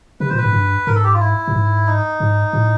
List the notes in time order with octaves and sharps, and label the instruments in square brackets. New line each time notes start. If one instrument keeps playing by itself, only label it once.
[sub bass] C3 [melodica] B4
[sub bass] A#2 [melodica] C5
[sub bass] G#2 [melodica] B4
[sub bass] G2
[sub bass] G#2 [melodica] A#4
[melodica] A4
G4
F4
E4
[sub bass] A2
G#2
[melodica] D#4
[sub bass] G#2
A2